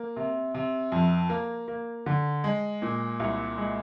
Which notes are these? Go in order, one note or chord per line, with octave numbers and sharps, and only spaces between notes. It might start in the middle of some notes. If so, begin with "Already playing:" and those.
Already playing: A#3
C3
C3
F2
A#3
A#3
D3
G#3
A#2
C2
G#3